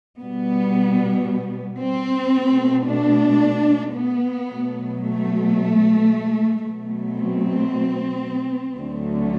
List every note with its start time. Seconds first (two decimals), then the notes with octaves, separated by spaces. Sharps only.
0.19 B2 G3 B3
1.80 C4
2.33 B2 A3
2.87 D4
3.94 B3
4.48 B2 F#3 A3
5.02 A3
6.62 B2 F#3 A3
7.15 C4
8.76 D2 D3 F#3 A3